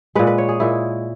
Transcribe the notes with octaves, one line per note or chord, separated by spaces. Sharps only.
A#2 G#3 B4
B4
C#5
G#4
A#2 G#3 E4